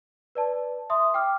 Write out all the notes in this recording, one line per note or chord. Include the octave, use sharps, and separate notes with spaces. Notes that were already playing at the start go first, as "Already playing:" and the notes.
B4 D5 A5
E5 C6 D#6
G5 D6 F6